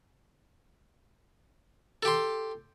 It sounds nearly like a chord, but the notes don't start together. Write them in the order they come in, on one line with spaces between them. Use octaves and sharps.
A4 G4 C6